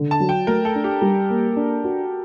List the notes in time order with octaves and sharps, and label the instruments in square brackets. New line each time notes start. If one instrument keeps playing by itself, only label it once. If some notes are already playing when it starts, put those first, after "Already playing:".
Already playing: [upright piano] D3
[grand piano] A5
[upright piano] F#3
[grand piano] G5
[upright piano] A3 [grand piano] A#4
[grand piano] A4
[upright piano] D4
[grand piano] G4
[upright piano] G3
A#3
D4
F#4